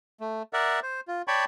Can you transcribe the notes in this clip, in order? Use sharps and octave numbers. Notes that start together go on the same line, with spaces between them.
A3
A#4 D5 E5 F#5
C5
F4
C#5 D5 G5 A5 B5 C#6